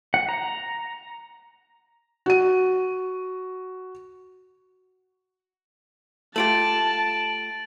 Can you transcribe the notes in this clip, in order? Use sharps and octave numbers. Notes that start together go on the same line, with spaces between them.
F#5
A#5
F#4 D#7
A3 F4 G4 A5 A6 D7 F#7